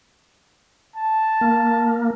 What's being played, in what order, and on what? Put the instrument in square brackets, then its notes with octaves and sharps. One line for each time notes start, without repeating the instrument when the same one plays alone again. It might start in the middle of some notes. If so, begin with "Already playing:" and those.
[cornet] A5
[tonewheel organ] A#3